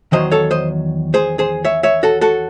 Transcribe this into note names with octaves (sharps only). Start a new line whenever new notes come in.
E2 D#3 F#3 C5 D#5
A4 C#5
C5 D#5
G#4 C5
G#4 C5
C#5 E5
C#5 E5
F#4 A4
F#4 A4